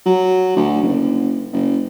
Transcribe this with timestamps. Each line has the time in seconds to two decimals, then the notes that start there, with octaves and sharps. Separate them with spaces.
0.06 F#3
0.56 D2
0.83 F#1
1.53 F#1